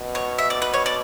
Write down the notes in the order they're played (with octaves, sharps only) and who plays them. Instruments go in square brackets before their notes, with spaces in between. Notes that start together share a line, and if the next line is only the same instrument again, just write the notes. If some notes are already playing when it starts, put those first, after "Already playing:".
Already playing: [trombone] B2
[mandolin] C#5
E5
D5
B4
C#5
D5